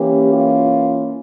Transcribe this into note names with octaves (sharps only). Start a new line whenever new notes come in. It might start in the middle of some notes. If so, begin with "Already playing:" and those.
Already playing: E3 A#3 C#4 G4
F4